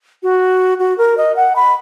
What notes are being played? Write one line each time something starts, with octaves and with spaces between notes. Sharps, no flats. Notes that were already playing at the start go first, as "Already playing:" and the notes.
F#4
F#4
A#4
D#5
F#5
B5